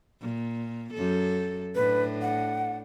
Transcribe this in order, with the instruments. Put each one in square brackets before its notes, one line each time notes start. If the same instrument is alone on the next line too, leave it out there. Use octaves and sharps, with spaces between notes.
[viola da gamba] A#2
F#2 A4
[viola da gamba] A2 D4 [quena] B4
[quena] F#5